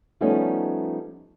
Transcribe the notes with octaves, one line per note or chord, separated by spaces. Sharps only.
F3 G3 A3 B3 C#4 D#4